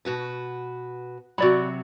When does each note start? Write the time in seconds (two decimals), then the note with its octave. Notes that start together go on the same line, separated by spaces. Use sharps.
0.05 B2 F#4 B4
1.38 C3 F#3 F#4 D5 B5